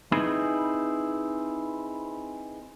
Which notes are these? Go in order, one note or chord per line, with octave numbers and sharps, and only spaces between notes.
C4 D#4 E4 G#4 B4